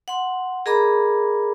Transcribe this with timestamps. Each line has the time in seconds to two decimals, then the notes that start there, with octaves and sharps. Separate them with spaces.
0.08 F#5 C6
0.66 G#4 A#4 D#5 A#5 B5 D6